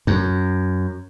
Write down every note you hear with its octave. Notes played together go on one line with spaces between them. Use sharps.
F#2